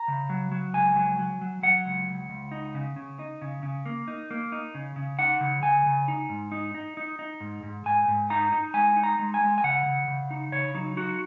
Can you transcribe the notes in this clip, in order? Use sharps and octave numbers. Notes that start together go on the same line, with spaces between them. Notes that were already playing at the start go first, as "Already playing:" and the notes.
Already playing: A#5
C#3
F#3
F#3
C#2 G#5
F#3
F#3
F#3
F#3 F#5
C#2
C#2
C#2
D#4
C#3
C#3
D#4
C#3
C#3
A#3
D#4
A#3
D#4
C#3
C#3
D#4 F#5
C#3
C#3 G#5
C#3
D#4
G#2
D#4
D#4
D#4
D#4
G#2
G#2
G#2 G#5
G#2
D#4 A#5
D#4
G#3 G#5
D#4
A#5
G#3
G#5
G#3
G#5
C#3 F#5
C#3
C#3
D#4
C#3 C#5
F#3 D#4
D#4 F#4